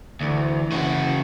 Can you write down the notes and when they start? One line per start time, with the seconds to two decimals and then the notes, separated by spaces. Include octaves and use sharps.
0.20 D2 E3
0.72 C#3 F#4